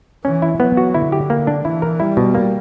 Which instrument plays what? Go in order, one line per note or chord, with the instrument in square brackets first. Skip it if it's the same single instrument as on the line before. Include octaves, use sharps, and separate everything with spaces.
[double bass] E3 [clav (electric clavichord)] C#4
[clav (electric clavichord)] E4
[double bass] F#3 [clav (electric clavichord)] B3
[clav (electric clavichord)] F#4
[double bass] D3 [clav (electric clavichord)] E4
[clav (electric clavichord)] G4
A#3
D4
[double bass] E3 [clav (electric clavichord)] E4
[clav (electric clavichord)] A#4
[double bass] G3 [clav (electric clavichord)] E4
[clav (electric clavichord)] B2
A#3